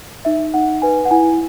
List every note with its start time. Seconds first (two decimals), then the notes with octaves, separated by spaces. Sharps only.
0.25 D#4 E5
0.54 D#4 F#5
0.82 B4 G#5
1.05 F#5
1.11 E4 G#5